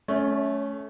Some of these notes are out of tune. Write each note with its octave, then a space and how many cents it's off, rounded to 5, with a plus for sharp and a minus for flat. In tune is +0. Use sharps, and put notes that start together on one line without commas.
A3 -20 C#4 +10